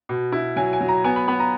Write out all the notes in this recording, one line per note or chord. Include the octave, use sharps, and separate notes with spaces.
B2
E4
F#3 G#5
G#5
F#3
A#5
B3 G#5
B5
B3 B5
A#5